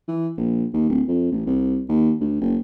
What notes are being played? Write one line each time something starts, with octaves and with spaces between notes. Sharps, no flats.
E3
A#1
D#2
D1
F2
A1
C2
D#2
D2
F#1